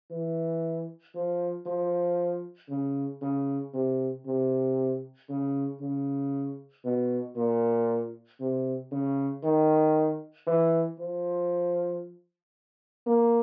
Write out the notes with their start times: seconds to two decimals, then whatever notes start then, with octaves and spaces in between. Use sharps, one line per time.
0.11 E3
1.15 F3
1.66 F3
2.69 C#3
3.22 C#3
3.74 C3
4.26 C3
5.29 C#3
5.81 C#3
6.84 B2
7.37 A#2
8.40 C3
8.92 C#3
9.44 D#3
10.47 E3
10.99 F3
13.06 A#3